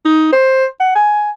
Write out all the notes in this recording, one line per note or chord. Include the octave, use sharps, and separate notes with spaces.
D#4
C5
F#5
G#5